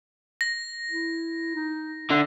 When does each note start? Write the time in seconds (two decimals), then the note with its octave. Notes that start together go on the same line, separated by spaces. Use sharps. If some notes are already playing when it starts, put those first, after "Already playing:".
0.41 A#6
0.91 E4
1.55 D#4
2.10 D3 E5